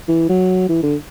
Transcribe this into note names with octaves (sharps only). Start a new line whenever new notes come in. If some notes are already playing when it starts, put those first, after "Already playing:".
E3
F#3
E3
D3